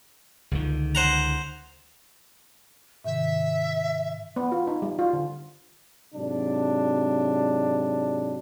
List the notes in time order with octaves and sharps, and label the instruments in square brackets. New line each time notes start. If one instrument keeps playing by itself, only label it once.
[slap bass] C#2 D3 D#3
[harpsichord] C5 F#5 A#5
[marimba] G#2 C3 D#3 [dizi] E5
[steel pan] B3
F4
D#4
G3
F4
D3
[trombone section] G#2 C3 F#3 D4